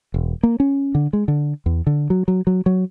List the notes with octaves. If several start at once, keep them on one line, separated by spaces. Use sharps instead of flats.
E1
A#3
C#4
D3
G#3
D3
E2
D3
F#3
F#3
F#3
F#3